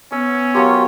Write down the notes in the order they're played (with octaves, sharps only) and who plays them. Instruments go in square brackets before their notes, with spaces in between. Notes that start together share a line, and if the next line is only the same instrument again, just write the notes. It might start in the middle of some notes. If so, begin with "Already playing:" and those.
[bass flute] B3 [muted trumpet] C#4 [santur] E6
[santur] F#3 A#3 G4 [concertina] F4 C#5